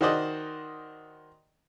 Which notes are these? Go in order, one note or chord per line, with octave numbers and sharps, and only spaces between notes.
D#3 F#4 C5 D5 D#5